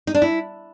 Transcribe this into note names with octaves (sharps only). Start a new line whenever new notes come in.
D#4
D4
E4